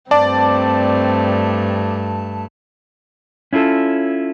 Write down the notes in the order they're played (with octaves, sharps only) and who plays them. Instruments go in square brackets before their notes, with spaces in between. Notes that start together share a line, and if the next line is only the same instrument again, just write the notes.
[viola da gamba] G2 A3 [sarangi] C4 [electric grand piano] D5 [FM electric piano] A5
[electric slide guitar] C#4 E4 F4 A4